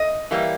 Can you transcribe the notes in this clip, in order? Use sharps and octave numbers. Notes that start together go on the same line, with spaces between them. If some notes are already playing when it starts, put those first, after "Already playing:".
Already playing: D#5
E3 G3 A#3